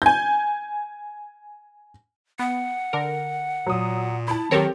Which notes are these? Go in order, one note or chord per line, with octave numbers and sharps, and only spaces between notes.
G#5 G6
B3 F#5
D3 A#4
A#2 F#3 D#6
E4 A5 B5
D#3 F#3 C4 G4 A4 A#4 C#5